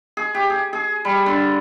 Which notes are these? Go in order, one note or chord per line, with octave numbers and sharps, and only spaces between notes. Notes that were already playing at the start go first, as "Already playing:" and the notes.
G#4
G4
G#4
G#4
G3
D3